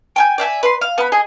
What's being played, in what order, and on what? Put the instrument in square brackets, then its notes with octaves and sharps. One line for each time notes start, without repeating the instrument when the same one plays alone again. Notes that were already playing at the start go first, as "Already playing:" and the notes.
[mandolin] G5 G#5 G6
D5 E5 G5 G#5
B4 B5 C6
F5
B3 B5
G#4 D#5 G#5